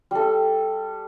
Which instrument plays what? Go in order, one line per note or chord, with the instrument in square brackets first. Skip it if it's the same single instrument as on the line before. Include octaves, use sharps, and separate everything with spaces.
[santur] G3 A4